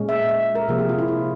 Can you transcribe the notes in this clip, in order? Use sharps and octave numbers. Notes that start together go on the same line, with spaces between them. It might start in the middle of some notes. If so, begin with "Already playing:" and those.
Already playing: A#2 G#3 C#4
E5
E5
A#4
C3 F3 A#3 G#4
G4
F4
E4
F4